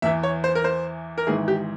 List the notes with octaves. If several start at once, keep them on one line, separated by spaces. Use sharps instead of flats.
E2 E3 E5
C#5
C5
A#4
C5
A#4
G#1 G#2 E3 G#4
G4